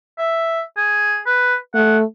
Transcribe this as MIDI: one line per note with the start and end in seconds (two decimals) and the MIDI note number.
0.19 0.61 76
0.77 1.20 68
1.26 1.55 71
1.74 2.04 57
1.74 1.98 78